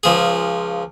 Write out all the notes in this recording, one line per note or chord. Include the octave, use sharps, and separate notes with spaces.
C#2 F3 G#4